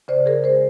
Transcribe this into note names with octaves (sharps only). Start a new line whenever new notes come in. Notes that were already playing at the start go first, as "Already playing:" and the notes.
C#3 C5 D5
G#4 A#4
G#3 A#4 C5